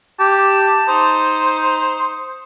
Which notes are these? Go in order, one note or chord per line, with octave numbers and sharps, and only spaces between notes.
G4 A5
D#4 C5